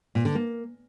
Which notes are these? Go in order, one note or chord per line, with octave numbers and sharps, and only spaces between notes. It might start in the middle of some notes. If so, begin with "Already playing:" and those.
A#2
D3
A#3